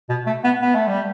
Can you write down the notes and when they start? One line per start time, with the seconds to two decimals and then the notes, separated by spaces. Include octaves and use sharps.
0.09 B2
0.27 A3
0.44 B3
0.62 B3
0.75 A3
0.88 G3